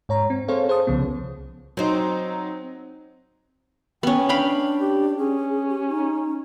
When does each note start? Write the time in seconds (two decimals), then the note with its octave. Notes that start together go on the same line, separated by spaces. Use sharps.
0.09 G#2 C#5 A#5
0.30 C4
0.48 C4 G#4 A4 C5 C#5 F5
0.68 G#4 C5 A5 D#6
0.87 C2 C#3 F3 B3
1.77 F#3 C4 D#4 C5
4.03 B3 C#4 G5
4.29 D4 F5 G5 B5
4.80 G4
5.18 C#4 G#4
5.69 G4
5.89 D#4